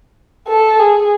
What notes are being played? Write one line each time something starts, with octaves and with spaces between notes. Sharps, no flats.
A4
G#4